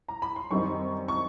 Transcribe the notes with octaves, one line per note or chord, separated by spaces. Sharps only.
A#5
B5
C6
F#2 D#3 G3 C4 D#4 C#6
C#6